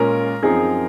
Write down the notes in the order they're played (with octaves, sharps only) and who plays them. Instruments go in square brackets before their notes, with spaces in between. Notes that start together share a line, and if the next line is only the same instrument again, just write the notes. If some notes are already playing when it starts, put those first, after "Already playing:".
Already playing: [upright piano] A#2 G#3 C#4 F4 [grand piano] A#4
[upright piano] F#2 F3 C4 D#4 [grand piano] G#4